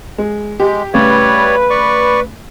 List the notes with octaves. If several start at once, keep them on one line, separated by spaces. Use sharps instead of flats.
G#3
G#3 G4
A2 C#3 G3 B4 C#5 D5
D5 C#6